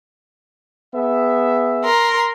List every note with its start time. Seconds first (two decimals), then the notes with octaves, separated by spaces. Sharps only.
0.95 B3 G#4 E5
1.83 A#4 C6